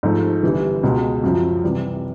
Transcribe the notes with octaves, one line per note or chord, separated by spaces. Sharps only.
G#2 F3 A3
G1 G2 E3
C#2 B2 G#3
F#2 C#3 F3
C3 E3 G3